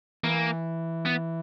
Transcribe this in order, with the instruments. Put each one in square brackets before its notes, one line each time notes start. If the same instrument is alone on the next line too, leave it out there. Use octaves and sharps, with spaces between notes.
[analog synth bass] E3 [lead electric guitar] A#3
[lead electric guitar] B3